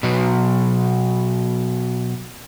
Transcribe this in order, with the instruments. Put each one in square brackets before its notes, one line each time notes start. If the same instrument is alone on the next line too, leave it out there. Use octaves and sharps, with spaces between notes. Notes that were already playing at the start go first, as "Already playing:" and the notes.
[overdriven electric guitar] B2 F#3